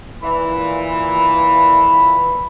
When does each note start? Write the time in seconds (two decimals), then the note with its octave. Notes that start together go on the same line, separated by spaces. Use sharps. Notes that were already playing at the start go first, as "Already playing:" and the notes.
0.23 A#2 E3 B5